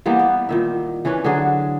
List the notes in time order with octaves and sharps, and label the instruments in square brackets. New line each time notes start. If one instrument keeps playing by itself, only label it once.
[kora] E3 G3 A#3 B3
B3
A#2 D#3 E5
E3 C#4 D4 B4
D3 F#3 D4 G#4